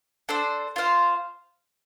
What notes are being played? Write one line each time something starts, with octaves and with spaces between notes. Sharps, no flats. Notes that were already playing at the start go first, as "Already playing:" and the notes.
D4 A4 C5
F4 C5 F5